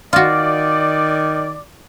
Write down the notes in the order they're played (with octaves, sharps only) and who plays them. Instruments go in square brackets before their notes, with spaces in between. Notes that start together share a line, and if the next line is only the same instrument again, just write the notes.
[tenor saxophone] D#3 [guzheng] F4 F#4 [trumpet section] D5